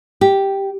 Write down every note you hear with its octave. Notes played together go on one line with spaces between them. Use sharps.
G4